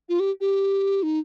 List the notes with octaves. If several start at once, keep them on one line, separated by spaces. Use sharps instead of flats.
F4
G4
G4
D#4